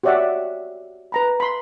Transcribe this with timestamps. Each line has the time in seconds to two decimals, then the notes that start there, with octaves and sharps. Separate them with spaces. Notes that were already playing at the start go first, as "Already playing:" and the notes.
0.04 F#4 G4 C#5 D5 E5 F#5
1.12 B4 A#5 B5
1.40 B5 C6